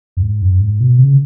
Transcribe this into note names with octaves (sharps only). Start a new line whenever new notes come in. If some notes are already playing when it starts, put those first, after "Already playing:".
F#2
G#2
F#2
G#2
B2
C#3